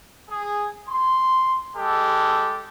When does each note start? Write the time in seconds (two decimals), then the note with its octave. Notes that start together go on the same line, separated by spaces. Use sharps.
0.30 G#4
0.90 C6
1.76 G#3 G4 A4